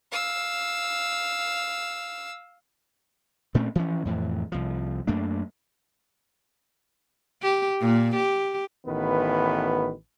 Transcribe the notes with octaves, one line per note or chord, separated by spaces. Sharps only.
F5 E6
A#2 A3 C4 C#4
E3 F3 C#4
F2 A2 E3
C2 F3
F#2 A3 A#3 D4
G4
A#2
G4
A1 D#3 B3 B4